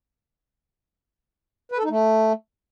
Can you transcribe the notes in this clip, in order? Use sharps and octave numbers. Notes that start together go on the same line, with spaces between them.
B4
A4
D#4
A3